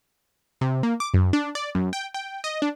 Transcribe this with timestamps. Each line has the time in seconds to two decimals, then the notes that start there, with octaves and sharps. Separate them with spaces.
0.61 C3
0.83 A#3
1.00 D6
1.14 F#2
1.33 D4
1.55 D5
1.75 F#2
1.93 G5
2.14 G5
2.44 D#5
2.62 D4